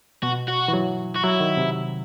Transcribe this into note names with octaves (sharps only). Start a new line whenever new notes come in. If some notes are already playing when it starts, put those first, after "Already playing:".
B2 F#4
F#4
E3
F#3
F#4
F#3 E4
D#3
C3